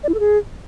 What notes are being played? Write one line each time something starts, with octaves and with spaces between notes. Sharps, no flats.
D5
E4
A4
G#4